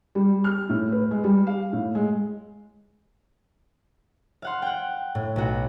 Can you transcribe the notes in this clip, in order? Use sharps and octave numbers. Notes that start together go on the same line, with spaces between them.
G3
F6
A2
B4
G#3
G3
F5
A2
G#3
F5 F#5 C6
F#5 G5
A2
B1 F#4